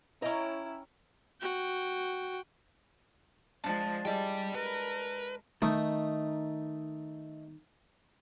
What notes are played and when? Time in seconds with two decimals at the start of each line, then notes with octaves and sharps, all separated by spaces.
0.22 C#4 E4 D#5 G5 A#5
1.41 F#4 G5
3.64 F3 G#3 D4 A5
4.05 G3 G#3 E4 G4 D5 G5
4.55 A#4 B4
5.62 D#3 A3 D#4